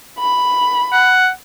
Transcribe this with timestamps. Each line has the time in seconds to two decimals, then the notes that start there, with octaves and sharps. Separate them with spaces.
0.19 B5
0.92 F#5